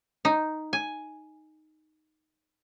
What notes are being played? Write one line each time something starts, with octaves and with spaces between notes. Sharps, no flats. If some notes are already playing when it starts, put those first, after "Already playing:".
D#4
G#5